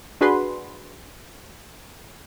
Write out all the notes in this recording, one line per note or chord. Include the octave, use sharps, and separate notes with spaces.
D4 F#4 G#4 B4 C6